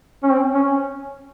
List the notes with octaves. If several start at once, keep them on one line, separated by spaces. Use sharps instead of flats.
C#4
C4
C#4